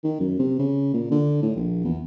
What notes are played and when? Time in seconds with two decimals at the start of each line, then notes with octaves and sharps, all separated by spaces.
0.04 D#3
0.20 F#2
0.39 C3
0.59 C#3
0.94 A#2
1.11 D3
1.42 A2
1.56 A#1
1.85 E2